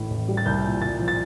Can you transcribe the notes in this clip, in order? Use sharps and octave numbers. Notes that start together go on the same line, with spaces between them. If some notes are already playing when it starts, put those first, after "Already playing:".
Already playing: A1 A2 D#3
A1
G3
A6
C2 G6
A#2
C2 A6
F3
A6